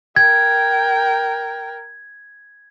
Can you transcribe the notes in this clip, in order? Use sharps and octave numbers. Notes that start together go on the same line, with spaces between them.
A#4 G5 G#6